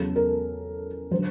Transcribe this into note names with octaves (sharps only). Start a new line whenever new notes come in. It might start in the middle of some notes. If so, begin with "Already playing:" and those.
Already playing: E2 C#3 F#3 A4
A#4
D3 F#3 C5